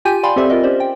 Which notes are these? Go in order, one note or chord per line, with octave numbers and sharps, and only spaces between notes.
F4 G4 G5 G#5 G6 D#7
D5 F5 G5 G#5 B5 C6
C4 G4 A4 C5 D5 E5
F4 A#4 D#5
C#4 G4 C5 D5
G5